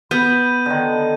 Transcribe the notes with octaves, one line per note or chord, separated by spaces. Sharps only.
B3 B5 G6 D#7
D3 D#3